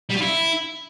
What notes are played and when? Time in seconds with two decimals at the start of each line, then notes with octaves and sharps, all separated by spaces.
0.09 G3
0.15 F4
0.21 E4